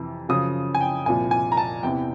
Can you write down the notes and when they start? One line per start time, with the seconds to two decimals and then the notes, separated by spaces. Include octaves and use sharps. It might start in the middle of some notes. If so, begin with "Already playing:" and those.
Already playing: F2 C3 E3
0.29 F#2 C#3 F3 D#6
0.75 G#5
0.81 G5
1.06 C2 A#2 F3 G#5
1.31 G#5
1.52 A#5
1.57 A5
1.83 E2 C3 E3 G5